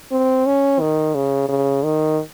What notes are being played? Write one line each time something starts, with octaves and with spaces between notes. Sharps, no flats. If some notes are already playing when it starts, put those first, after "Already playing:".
C4
C#4
D#3
C#3
C#3
D#3